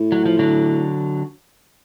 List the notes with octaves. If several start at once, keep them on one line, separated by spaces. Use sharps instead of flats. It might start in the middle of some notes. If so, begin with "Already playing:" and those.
Already playing: A2
F#3
F3
D3 F#3